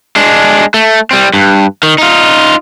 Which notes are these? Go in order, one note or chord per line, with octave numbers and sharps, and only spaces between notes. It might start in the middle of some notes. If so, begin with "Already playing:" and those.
G#3 D4
A3
G3 C4
G2
D#3
D#4 F4